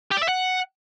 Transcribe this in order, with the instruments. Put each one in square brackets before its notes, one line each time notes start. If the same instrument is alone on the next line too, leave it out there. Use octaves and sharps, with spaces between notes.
[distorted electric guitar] G4
D5
E5
F#5